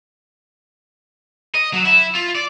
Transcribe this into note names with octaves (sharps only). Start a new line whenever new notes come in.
D#5
F#3
E4
F4
D5